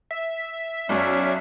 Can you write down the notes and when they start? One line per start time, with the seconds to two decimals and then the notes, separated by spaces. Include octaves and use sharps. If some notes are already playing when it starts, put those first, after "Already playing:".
0.11 E5
0.89 B1 F#2 C#4 D5